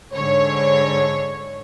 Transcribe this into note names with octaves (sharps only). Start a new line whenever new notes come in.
G#2 D3 C#5